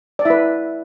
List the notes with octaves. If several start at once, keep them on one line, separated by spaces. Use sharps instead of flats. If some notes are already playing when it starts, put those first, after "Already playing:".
D5
E4 B4 E5